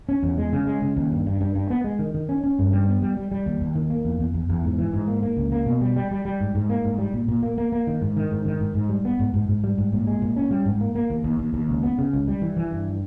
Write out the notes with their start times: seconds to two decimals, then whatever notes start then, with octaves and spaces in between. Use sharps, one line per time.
0.09 C#4
0.23 E2
0.38 G#3
0.53 C#3
0.67 G#3
0.82 C#3
0.96 D#2
1.12 G2
1.26 G2
1.41 G2
1.55 G2
1.70 B3
1.84 G#3
1.99 D#3
2.14 D#3
2.29 C#4
2.44 C#4
2.59 G2
2.73 G3
2.88 B3
3.02 G3
3.17 G3
3.32 G3
3.46 D#2
3.61 D#2
3.75 D#3
3.90 A#3
4.05 E2
4.20 E2
4.34 E2
4.49 E2
4.64 G#2
4.78 E3
4.93 G#2
5.08 A#3
5.23 A#3
5.37 C#2
5.52 A#3
5.66 B2
5.81 G3
5.96 G3
6.11 G3
6.25 G3
6.41 G#2
6.55 G#2
6.69 A#3
6.84 G#2
6.98 G3
7.13 A#2
7.28 A#2
7.43 A#3
7.58 A#3
7.72 A#3
7.87 D#3
8.02 G#2
8.17 D#3
8.31 G#2
8.45 D#3
8.60 G#2
8.75 G#2
8.89 G3
9.05 B3
9.19 G#2
9.34 G#2
9.49 G#2
9.64 G3
9.78 G#2
9.93 A#2
10.07 G#3
10.22 A#2
10.36 C#4
10.51 G3
10.66 G#2
10.81 A#3
10.95 A#3
11.10 D#2
11.24 D#2
11.39 D#2
11.54 D#2
11.69 C#2
11.83 B3
11.98 C#3
12.13 C#2
12.28 G3
12.42 E3
12.57 E3
12.71 G2